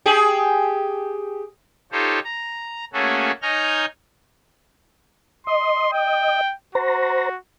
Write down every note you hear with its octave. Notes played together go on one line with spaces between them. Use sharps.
G4 G#4
D#4 F4 G4 A4 C5 C#5
A#5
A3 A#3 C#4 F#4 G#4 A4
D#4 C#5 G#5 A#5 F6 G6
D#5 C6
G5
F#4 C5 A#5